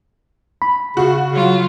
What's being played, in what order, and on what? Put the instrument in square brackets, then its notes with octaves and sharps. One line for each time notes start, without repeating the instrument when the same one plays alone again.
[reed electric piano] B5
[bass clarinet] C#3 [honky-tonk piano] F#4
[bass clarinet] C#3 [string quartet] F#3 F4